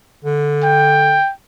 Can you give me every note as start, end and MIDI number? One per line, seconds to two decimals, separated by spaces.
0.24 1.19 50
0.63 1.31 79